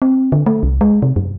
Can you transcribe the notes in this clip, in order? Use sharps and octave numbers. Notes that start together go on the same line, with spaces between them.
C4
D3
A3
C2
G#3
C3
F#2